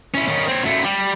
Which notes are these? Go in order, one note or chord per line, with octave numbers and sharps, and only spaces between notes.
C#4 E4
D#3 C#4
C4 C#5
F#2 A3
G3